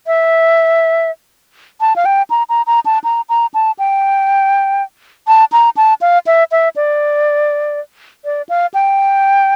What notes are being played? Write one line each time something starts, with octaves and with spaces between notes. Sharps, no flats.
E5
A5
F5
G5
A#5
A#5
A#5
A5
A#5
A#5
A5
G5
A5
A#5
A5
F5
E5
E5
D5
D5
F5
G5